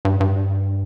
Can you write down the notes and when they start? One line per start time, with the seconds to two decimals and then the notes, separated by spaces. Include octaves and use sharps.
0.05 G2
0.20 G2